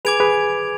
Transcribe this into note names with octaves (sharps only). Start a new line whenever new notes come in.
G#4 B4 G#5 D6 G#6 D7 F7
G#4 B4